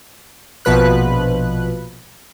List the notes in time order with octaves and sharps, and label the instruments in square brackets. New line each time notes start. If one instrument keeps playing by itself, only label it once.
[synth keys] A#1 B2 F3 B4 F#6